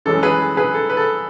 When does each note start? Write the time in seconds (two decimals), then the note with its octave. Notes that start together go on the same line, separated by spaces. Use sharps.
0.06 F#2 E3 G#3 C#4 A4
0.23 G#4 B4
0.57 G#4 B4
0.74 A4
0.90 B4
0.97 A4